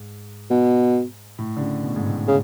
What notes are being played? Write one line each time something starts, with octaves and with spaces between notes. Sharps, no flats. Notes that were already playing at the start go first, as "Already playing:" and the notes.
Already playing: G#2
B2
A2
D3
C#3
B2
G#2
A2
C#3